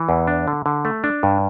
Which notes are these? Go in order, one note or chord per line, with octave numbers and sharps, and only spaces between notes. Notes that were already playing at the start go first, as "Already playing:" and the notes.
Already playing: E3
E2
D4
D3
D3
A3
D4
G2